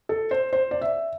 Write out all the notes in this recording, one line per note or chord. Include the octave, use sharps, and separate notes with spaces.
A4
C5
C5
D5
E5